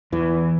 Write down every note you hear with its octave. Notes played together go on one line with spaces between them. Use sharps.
E2 E3